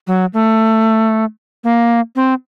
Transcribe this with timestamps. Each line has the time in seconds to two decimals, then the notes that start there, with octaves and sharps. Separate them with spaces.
0.07 F#3
0.34 A3
1.64 A#3
2.16 C4